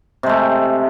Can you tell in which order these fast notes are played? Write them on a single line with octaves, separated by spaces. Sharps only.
C3 G#3 A3